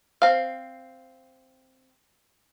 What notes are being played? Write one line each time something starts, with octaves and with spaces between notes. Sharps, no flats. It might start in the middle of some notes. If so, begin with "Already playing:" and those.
C4 F5